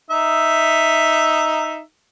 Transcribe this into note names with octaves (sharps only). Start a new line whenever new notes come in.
D#4 E5